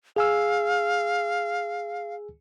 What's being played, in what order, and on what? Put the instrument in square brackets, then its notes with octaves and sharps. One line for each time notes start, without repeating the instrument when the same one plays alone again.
[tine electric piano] G#4 G#5 E6 [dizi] F5